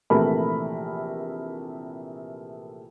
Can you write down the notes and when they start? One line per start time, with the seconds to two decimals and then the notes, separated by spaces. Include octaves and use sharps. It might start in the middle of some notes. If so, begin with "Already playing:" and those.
0.10 A#1 C3 E3 A3 A#4 B5